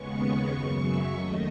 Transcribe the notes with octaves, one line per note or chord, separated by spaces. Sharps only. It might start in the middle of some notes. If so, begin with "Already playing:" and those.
Already playing: D#2 C#3 G#3 B3 C#6
F#2 C#3 F#3
E5
D#2 D#3 A3 D#5